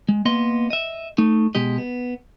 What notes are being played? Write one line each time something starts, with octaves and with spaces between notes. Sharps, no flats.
G#3
A#3 B3 D#5 C6
D#5 E5
A3 D#4
B2 G#3 G4 D#5
B3